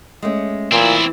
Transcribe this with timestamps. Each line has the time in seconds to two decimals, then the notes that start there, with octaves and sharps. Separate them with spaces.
0.22 G#3 A3 C#4
0.72 A#2 E3 C4 E4